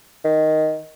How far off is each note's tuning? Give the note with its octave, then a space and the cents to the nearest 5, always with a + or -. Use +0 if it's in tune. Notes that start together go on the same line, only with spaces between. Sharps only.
D#3 +0